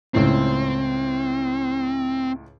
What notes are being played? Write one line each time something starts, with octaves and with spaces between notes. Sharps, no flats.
C#2 A2 C4